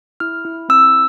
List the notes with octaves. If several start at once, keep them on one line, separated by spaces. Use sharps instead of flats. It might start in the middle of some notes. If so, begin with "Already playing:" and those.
E4 F6
E4
C4 E6